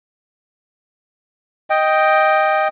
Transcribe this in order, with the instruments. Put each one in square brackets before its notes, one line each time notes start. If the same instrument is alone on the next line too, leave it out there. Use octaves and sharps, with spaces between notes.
[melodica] D#5 G5